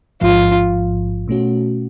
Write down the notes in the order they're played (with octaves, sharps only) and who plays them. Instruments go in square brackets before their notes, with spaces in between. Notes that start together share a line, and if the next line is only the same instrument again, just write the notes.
[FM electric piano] A1 G#2 F3 [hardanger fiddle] F4
[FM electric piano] B2 A3 C#4 F#4